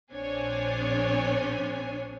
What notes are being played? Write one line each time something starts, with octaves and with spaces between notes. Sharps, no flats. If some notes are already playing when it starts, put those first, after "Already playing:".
A#1 C4 D4 C#5 G#5